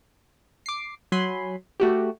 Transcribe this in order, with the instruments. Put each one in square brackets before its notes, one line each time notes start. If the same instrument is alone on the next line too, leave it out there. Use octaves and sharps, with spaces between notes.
[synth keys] D6 C7
F#3 G#5 B5 C6
A3 F#4 G4